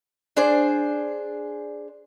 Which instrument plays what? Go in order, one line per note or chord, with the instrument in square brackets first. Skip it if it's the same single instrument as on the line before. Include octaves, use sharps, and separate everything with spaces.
[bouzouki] D4 G#4 C5